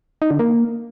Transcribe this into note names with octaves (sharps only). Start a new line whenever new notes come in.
D#4
D3
A#3